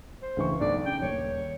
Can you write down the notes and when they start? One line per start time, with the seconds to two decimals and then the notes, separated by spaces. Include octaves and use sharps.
0.22 C5
0.37 C#2 E3 C#6
0.61 B1 D5
0.86 C#3 G5
1.02 D#1 C#5